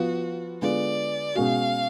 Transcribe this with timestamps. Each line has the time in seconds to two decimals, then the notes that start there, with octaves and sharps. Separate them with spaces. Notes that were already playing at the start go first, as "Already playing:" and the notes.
Already playing: F3 B3 F4 F#4
0.61 D3 G#3 B3 F4 D5
1.35 B2 G#3 C#4 F#4 F5